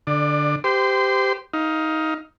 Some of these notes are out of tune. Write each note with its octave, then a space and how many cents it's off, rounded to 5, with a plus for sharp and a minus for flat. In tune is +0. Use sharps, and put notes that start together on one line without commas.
D3 +0 D5 +25
G4 +0 C5 -30 C6 -20
D#4 +15 F5 +0